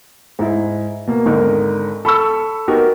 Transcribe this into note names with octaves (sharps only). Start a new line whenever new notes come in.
G#2 E4
B2 A#3
G#1 D3 D#4 A#4
A4 B5 C#6 E6
B3 D#4 F#4 G4 A#4